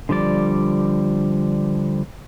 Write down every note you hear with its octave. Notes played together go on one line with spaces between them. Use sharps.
D3 F3 G3 D5